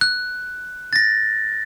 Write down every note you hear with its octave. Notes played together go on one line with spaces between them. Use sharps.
F#6
A6 A#6